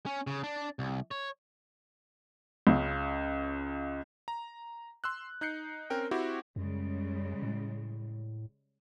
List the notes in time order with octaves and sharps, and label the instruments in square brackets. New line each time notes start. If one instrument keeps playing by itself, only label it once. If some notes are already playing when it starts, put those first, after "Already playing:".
[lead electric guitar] C#4
C#3
D4
C2
C#5
[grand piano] C#2 C#3
[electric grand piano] A#5
C6 E6 F#6
D#4 F#6 G6 C7 C#7
C4 C#4 A#4 G5
C4 E4 F#4 G4
[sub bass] F#2 [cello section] C#3 G3 G#3
[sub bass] A2